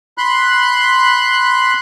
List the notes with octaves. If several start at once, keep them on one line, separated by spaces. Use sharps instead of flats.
B5 C6 F#6